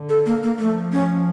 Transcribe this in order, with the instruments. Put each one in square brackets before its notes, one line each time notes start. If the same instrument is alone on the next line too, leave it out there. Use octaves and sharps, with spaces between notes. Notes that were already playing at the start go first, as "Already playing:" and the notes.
Already playing: [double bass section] D3
[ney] A4
A#3
A#3
[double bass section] F3 [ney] A3
[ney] C#4